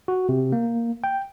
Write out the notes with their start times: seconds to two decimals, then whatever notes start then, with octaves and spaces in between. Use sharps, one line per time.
0.08 F#4
0.29 C3
0.52 A#3
1.04 G5